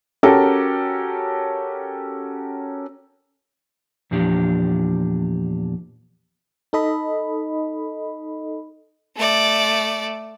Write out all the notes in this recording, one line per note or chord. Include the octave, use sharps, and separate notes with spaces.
C#4 F#4 G4 A4 A#4
E2 A#2 F3 D4 G4
D#4 A4 D#5 B5
A3 D5